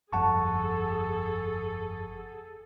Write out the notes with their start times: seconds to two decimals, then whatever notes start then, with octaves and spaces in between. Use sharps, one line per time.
0.13 G1 F2 G#4 A4 F#5 A5 C#6